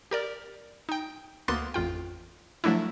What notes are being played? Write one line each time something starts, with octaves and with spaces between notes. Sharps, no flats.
G4 A#4 D5
D#4 G5
D2 A#3 B3 C6 F#6 A6
A1 F2 F4 G5
F3 F#3 A3 D4 E4